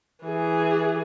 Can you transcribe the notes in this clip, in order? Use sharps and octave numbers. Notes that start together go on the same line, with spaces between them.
E3 G#4